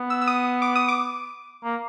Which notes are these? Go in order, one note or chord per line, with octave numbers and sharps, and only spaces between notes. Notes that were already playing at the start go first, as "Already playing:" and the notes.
Already playing: B3
E6
E6
D#6
D6
D#6
D6
A#3